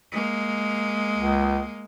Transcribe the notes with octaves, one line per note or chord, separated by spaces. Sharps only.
G#3 A#3
C#2